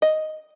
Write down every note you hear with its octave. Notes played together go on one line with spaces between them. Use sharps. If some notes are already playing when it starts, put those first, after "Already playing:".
D#5